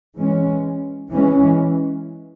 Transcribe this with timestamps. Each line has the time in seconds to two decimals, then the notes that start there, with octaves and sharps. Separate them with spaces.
0.17 E3 G#3 C#4
1.11 E3 G#3 C#4